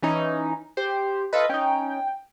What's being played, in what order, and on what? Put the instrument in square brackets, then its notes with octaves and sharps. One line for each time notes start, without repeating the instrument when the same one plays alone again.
[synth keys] E3 C#4 D#4
[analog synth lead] G4 [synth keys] C5
[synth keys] F4 A4 B4 [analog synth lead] D#5
[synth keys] C#4 D#4 [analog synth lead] G5